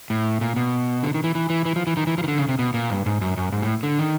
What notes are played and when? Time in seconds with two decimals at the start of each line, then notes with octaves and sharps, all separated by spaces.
0.10 A2
0.41 A#2
0.56 B2
1.03 D3
1.14 D#3
1.24 E3
1.35 E3
1.50 E3
1.65 E3
1.76 F3
1.87 E3
1.97 D#3
2.07 E3
2.18 F3
2.24 D#3
2.28 D3
2.38 C#3
2.49 C3
2.59 B2
2.74 A#2
2.90 G2
3.06 G#2
3.21 F#2
3.37 F#2
3.52 G#2
3.62 A2
3.83 D3
3.99 D#3